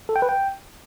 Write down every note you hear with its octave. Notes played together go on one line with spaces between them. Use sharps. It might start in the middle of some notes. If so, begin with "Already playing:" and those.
A4
G5
B4
G5